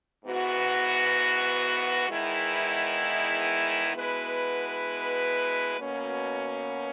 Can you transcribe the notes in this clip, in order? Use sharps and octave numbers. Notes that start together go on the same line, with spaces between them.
G#2 E3 B3 F#4
E2 D#3 G#3 B3 E4
B2 G#3 B3 E4 B4
B2 A#3 C#4